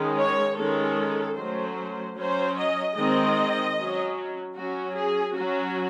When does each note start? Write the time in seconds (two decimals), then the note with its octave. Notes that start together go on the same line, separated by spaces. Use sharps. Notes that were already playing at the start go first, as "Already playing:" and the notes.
Already playing: D#3 G#3 C#4
0.18 C#5
0.57 D#3 G#3 C#4 A4
1.36 F#3 A3 C#4 C5
2.16 F#3 C#4 C5
2.57 D#5
2.96 D#3 G#3 C4 D#5
3.76 F#3 C#4
4.55 F#3 C#4 F#4
4.94 G#4
5.34 F#3 C#4 F#4